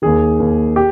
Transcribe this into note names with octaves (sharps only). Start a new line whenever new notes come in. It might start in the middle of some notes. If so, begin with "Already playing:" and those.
D#2 D#3 G#4
D#2 D#3
G4